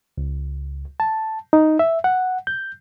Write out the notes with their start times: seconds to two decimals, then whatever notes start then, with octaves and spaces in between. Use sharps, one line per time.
0.18 C#2
1.00 A5
1.53 D#4
1.79 E5
2.04 F#5
2.47 G6